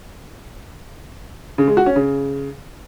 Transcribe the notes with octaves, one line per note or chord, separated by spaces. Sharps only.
C#3
G#3
F#4
C#4
C#3